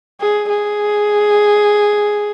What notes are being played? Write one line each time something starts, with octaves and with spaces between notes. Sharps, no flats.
G#4
G#4